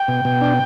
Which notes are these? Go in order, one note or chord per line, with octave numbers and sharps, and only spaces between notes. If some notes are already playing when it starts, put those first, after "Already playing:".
Already playing: G5
B2
B2
D4